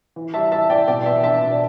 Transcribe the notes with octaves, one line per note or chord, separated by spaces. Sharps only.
E3
G3 E5 A5
E4 E5 A5
E3 D5 G5
B2 D5 G5
B3 E5 A5
D4 E5 A5
B2
D5